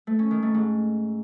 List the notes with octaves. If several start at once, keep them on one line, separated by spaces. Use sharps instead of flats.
A3
C#4
D#3
A3
G#2